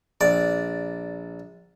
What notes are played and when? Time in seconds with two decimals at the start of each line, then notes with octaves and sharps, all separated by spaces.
0.21 A#1 D5